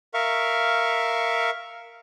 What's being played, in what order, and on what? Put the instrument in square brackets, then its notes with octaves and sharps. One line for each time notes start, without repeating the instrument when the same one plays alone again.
[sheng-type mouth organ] A#4 E5 F5 C#6